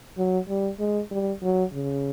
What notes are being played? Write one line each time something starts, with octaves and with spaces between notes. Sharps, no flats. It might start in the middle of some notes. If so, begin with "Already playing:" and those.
F#3
G3
G#3
G3
F#3
C#3